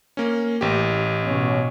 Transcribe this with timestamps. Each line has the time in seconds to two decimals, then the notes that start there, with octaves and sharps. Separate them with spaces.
0.17 A#3 C#4
0.61 A1 G4
1.25 B2 C#4